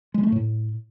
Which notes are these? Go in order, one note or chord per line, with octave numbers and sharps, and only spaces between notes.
G#3
A3
A2